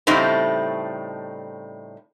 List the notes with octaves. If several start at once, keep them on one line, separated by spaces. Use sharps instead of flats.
A2 C#3 G3 A3 C4 D#4